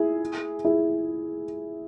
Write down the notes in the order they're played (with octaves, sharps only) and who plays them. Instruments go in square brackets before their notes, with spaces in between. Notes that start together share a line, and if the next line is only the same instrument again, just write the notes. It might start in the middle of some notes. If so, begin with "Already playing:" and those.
Already playing: [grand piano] E4 G#4
E4 G#4